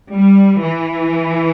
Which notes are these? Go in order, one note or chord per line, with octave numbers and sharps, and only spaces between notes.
G3
E3